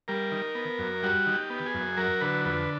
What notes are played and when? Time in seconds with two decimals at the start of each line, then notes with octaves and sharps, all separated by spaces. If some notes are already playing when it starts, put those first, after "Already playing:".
0.08 G3 A#4
0.32 D#3
0.55 B3
0.79 F#2
1.03 G3 F#4
1.27 D#3
1.34 G4
1.50 B3
1.66 G#4
1.74 F#2
1.97 F#3 A#4
2.21 D3 B4
2.45 F2 B4